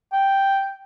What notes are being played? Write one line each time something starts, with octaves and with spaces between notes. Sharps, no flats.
G5